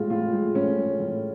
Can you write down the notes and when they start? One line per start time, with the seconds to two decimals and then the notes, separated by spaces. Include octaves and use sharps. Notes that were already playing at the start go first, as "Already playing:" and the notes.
Already playing: A2 G#3 F4
0.10 A2 F4
0.33 G#3
0.55 A2 C#4
0.78 G#3
1.00 A2